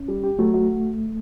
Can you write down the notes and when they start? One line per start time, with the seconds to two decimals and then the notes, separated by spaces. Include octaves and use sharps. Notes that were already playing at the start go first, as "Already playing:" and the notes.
Already playing: C#4
0.08 G3
0.23 G4
0.39 F#3 A3
0.54 F#4